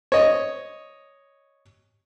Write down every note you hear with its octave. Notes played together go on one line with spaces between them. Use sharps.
C#5 D#5